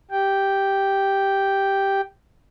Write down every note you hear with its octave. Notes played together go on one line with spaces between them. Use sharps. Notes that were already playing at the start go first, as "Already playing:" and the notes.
G4 G5